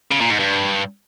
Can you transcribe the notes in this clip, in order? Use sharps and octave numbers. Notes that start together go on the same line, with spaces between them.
C#3
A#2
G#2
G2